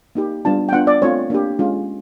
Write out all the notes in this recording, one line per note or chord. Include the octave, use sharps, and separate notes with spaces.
A#3 D#4 G4
G3 B3 D4 F4 A5
G5
B3 D4 F4 F#5
D5
A3 C4 F4 C#5
A#3 D4 G4
G#3 C#4 F4